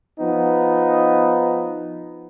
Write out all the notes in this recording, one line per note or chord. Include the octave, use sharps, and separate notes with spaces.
F3 B3 D#4